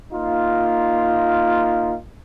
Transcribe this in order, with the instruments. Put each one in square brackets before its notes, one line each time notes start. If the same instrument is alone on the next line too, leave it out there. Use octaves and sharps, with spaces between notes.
[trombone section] A#3 D#4 F4